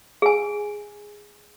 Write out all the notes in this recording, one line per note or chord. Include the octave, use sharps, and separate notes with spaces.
G#4 G#5